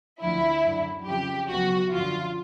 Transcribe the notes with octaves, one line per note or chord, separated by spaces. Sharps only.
D2 D3 F3 E4
F#2 D3 F#3
F2 C#3 F3 G4
C#2 B2 F#3 F#4
F#2 D3 F3 F4